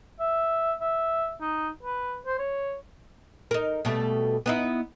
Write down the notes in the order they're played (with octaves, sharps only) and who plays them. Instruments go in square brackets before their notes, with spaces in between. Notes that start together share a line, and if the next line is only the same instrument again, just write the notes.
[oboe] E5
E5
D#4
B4
C5
C#5
[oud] D#4 A#4
B2 G3 A3
B3 D#4 E4